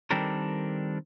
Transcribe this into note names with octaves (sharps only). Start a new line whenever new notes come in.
D#3 G3 C4 D4 A4 A#4